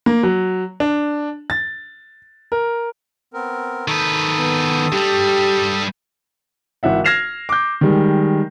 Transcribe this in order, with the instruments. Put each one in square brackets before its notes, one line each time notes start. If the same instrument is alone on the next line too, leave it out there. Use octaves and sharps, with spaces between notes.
[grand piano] A#3
F#3
D4
A6
A#4
[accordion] B3 C4 A#4
[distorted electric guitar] D#3 B4 [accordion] A4 D#6
[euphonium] B3
[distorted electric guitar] G2 G3 [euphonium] G4
[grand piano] G#1 E3 E5 F#5
F6 G#6 A#6 C7 E7 F7
D6 G6
D#3 G3 G#3